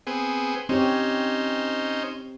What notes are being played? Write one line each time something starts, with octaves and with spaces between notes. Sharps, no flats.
B3 C4 G#4
C4 C#4 D#4 G4 C5 C#5